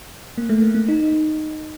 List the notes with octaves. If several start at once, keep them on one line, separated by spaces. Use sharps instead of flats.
A#3
A3
A#3
A#3
D#4